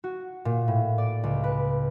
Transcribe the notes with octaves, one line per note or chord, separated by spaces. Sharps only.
F#4
A#2
A2
D5
C#2
B4